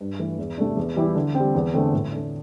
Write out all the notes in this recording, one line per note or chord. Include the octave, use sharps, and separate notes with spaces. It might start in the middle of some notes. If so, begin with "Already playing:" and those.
G2
E3 A3
E2
C3 A3 D4
E2
E3 G3 E4 G4
D3
C4
G3
E2
D3 A3 C4
A2
A3 D4